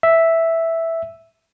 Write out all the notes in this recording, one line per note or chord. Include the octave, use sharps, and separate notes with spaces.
E5